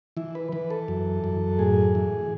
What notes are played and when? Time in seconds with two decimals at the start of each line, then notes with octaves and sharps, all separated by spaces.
0.17 E3 E4
0.35 B4
0.52 E3 B4
0.70 A4
0.88 F#2
1.24 F#2
1.59 A2 G#4
1.95 E3